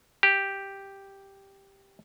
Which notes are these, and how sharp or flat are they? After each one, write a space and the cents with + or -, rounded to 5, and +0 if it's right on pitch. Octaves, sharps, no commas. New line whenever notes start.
G4 +0